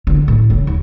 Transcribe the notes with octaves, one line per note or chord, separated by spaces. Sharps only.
D3
A2
C#3
D#2